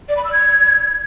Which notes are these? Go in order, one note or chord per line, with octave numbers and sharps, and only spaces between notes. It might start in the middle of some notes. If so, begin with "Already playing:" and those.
D5
B5
E6
G#6